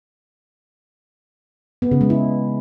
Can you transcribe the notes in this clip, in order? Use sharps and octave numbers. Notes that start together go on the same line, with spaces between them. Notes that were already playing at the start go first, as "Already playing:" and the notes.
B3
C#3
G#3
E4